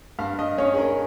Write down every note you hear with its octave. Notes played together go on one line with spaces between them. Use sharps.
G2 F5
G2 D#5
C#4 C#5
G#4
C#4 A#4